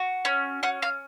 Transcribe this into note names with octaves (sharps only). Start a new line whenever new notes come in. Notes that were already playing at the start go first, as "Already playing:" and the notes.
Already playing: F#4
C#4
C#4 F#5
F5